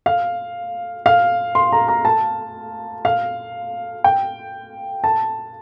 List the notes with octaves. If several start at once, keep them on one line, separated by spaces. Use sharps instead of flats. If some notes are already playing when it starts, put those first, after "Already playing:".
F5
F5
C6
A#5
A#5
A5
F5
G5
A5